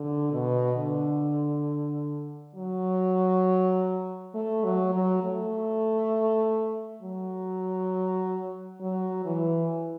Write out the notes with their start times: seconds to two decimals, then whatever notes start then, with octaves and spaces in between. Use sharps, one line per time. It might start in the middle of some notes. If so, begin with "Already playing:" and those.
Already playing: D3
0.32 B2
0.77 D3
2.56 F#3
4.34 A3
4.64 F#3
4.94 F#3
5.24 A3
7.02 F#3
8.81 F#3
9.25 E3